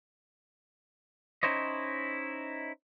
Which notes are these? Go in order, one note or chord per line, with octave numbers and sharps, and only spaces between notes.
C#4 D#4 E4 C5 C#5 D#5